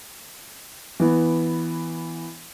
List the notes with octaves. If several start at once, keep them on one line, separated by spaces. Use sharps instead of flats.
E3 B3